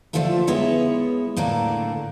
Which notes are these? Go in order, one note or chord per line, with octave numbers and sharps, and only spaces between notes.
D3 F3 A3 D4 F4 A4
G#3 B3 E4 C#5 E5
A2 D3 A#3 D4 A4